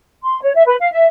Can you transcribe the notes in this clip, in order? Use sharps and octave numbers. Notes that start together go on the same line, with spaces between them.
C6
C#5
E5
B4
F5
E5